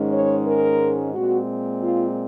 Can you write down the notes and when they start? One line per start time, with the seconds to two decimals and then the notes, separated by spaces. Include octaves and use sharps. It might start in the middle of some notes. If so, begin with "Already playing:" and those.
Already playing: G#2 D#3 G#3 C#4
0.12 C#5
0.46 A#4
1.14 A#2 G#3 C4 F#4
1.82 F4